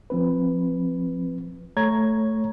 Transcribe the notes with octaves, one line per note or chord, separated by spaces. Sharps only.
F3 C4 B4
A3 C#5 A#5 G#6